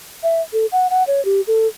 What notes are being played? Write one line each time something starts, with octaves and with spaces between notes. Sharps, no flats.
E5
A4
F#5
F#5
C#5
G4
A4